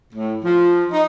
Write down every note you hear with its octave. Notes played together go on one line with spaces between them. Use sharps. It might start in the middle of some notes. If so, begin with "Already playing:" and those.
A2
F3
D#4